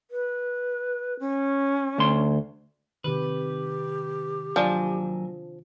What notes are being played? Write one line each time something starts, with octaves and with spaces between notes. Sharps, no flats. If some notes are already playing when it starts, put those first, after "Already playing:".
B4
C#4
D2 C6
C3 D#3 G4 B4
D#2 F3 F#3 D4 G#5